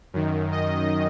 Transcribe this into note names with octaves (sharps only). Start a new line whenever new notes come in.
F#2 D#3
D#5